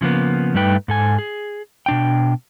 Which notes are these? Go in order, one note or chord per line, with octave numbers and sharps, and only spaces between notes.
C#3 F3 A#3 B3
G2 G3 A3 D#4 B4 G5
G#2 A4 G#5
G#4
B2 D4 G5